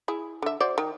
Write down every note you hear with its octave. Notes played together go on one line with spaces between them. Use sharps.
E4 G#4
D3 E5
F#4 C5 D5
D#3